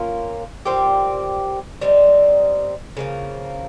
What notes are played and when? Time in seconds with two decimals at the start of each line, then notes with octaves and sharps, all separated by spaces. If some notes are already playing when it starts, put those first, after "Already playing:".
Already playing: A#3 C#4 F4 A#4
0.66 A#2 G3 C4 G4
1.81 G3 C4 D#4
2.97 C#3 F3 A#3